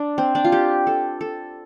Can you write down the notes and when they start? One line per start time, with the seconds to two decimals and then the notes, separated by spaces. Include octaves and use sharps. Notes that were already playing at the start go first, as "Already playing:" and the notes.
Already playing: D4
0.18 C4
0.35 D4
0.45 F4
0.52 G4
0.87 A4
1.21 A4